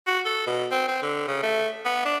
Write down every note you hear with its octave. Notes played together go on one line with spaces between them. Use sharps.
F#4
A4
B2
C4
C4
D3
C#3
A3
B3
D4